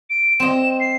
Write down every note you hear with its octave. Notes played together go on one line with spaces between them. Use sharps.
D7
C4 D#5 E7
C7